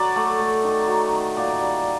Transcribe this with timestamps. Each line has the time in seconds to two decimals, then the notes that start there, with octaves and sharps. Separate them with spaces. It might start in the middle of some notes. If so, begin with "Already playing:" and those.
Already playing: F#3 D5
0.16 A3
0.40 A3
0.64 D#3
0.88 F#3
1.12 D#3
1.37 A#2 D5
1.61 G3